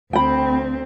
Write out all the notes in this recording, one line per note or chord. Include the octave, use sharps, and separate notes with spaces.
D2 C4 G5 B5